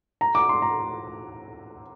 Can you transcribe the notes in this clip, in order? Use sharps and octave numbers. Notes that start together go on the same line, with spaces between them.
A#5
D6
C6
A#5